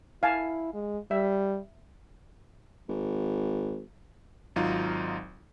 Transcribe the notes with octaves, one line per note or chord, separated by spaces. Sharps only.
E4 F5 G#5 A5
G#3
G3 E5
G#1
G#1 F#3 D#4 F4